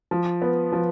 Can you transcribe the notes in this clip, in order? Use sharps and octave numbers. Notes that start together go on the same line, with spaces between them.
F3
B3
F3